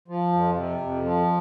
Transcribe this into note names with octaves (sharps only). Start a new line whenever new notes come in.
F3
F2
C3
F2
F3